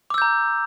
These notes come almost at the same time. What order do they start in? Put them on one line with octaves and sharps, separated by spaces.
D6 E6 G6 A#5